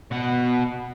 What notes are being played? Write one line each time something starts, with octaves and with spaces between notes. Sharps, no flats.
B2 F#5